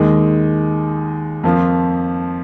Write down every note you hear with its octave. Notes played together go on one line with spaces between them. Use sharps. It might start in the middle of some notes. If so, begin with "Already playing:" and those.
Already playing: D#2 D#3 G#3
F2 F3 A#3